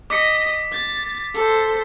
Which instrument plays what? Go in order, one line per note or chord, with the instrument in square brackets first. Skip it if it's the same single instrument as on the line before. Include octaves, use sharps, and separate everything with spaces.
[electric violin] D#5 [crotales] D6 B6 C#7
[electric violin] A6
A4 C5